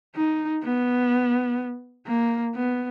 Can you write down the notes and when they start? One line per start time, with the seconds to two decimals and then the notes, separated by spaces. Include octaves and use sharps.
0.16 D#4
0.63 B3
2.07 A#3
2.55 B3